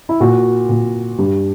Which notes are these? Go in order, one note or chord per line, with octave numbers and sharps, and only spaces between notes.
E4
A#2 F#4
A#2
G2